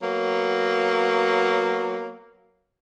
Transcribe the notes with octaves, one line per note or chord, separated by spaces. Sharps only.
F#3 A#3 B3 C#5